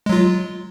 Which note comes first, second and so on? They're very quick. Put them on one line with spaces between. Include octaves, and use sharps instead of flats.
G#3 F#3 F4